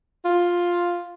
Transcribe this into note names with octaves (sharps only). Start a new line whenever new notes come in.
F4